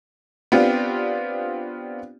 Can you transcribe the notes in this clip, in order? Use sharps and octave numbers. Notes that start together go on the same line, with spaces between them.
B3 C4 D4 F4 G4